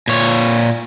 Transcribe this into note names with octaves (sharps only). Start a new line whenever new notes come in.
A#2 C#5